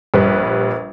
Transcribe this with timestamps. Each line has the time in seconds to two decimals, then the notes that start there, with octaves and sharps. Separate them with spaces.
0.14 A#1 G3 B4